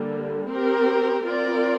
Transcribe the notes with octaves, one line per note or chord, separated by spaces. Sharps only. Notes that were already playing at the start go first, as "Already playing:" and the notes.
Already playing: D3 G3 A#3
C4 G4 A#4
C4 F4 A#4 D5